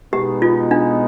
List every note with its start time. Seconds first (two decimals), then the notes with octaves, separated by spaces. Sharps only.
0.13 B2 G#3 B3 D#4 G4
0.42 F4
0.71 D4